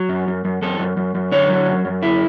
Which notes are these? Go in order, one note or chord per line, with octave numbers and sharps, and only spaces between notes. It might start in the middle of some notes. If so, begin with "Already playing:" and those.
Already playing: F#3
F#2
F#2
F#2
F#2 A4
F#2
F#2
F#2
D3 C#5
F#3
F#2
F#2
E4